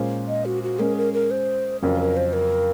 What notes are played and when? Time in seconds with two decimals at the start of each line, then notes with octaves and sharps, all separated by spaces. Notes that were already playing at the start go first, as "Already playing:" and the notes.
Already playing: A#2 G#3 C#4 F4 C5
0.28 D#5
0.45 F#4
0.63 F#4
0.79 G#3 C#4 G#4 A#4
0.97 A#4
1.14 A#4
1.31 C5
1.82 F2 C#3 F#3 C#4 A#4
2.00 A#4
2.17 C5
2.33 A#4